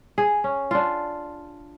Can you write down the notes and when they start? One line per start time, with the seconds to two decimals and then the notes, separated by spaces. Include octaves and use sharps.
0.18 G#4
0.44 C#4
0.71 D4 F4